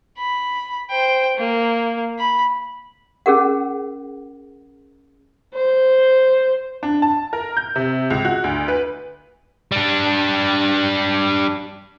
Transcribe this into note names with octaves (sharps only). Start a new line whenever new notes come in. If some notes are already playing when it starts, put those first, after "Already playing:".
B5
C5 G5
A#3
B5
C#4 G#4 A#4 F#5
C5
D4
A5
A#4
G6
C3
C#2
F#4
D2
B4
G3 D4